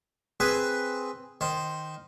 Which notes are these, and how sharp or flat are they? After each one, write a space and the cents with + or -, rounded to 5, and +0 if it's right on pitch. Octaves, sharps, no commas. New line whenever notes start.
C4 +0 G#4 +0 B4 +0
D#3 +0 C5 +0